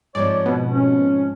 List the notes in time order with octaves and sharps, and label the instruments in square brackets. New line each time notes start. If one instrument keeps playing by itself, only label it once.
[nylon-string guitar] G#2 F3 C4 [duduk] C#5 [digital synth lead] D5
[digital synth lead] B2
[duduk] C#4